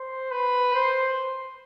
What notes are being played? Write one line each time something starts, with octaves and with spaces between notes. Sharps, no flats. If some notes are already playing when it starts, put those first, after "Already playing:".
Already playing: C5
B4
C5